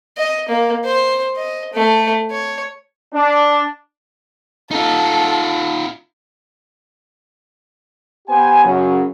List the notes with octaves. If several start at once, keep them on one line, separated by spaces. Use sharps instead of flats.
D#5
A#3
C5
D#5
A3
C#5
D4
D#4 F4 A4
B3 G4 C5 G5 G#5
F#2 C#3 F#3